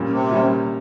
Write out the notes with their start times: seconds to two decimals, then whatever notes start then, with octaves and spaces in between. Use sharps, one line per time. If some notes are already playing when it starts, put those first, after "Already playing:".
Already playing: A#2 G3 C#4
0.12 C3
0.31 A#2 G3 C#4